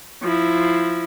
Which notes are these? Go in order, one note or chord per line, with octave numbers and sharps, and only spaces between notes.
F3 E4